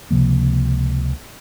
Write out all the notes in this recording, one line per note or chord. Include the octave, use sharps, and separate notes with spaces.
C#2 C3 F3 A#3